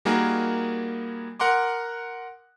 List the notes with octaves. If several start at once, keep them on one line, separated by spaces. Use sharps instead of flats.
G3 A#3 D#4 F#4 G#4 A#4
A#4 F#5 A#5 C6 D6